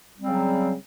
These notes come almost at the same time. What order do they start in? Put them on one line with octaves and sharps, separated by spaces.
G3 C4 F#3 C#3